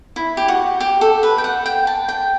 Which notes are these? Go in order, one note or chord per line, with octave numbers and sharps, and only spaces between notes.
E4
G4
F#4
G4
A4
B4
G5
F#5
G5
A5
G5